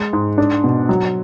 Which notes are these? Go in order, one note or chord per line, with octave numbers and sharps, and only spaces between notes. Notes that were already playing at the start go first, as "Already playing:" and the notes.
Already playing: G#3
G#2
D4
B2
F#3